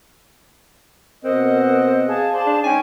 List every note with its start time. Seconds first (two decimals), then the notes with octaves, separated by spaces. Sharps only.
1.24 B2 C4 A#4 D#5 F#5
2.08 G#4 F5 A5
2.33 G#4 C5 D5 A5
2.46 D4
2.64 G#3 C#4 D#4 G5 G#5